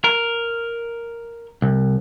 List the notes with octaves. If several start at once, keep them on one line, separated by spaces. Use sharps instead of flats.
A#4
C2